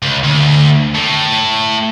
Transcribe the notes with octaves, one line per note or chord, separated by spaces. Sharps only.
C#2
D2
A2